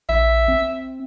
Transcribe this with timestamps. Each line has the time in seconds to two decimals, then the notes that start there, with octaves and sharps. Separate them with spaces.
0.09 A#1 E5
0.48 C4